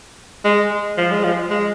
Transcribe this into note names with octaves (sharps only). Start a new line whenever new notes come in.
G#3
F3
G#3
F3
G#3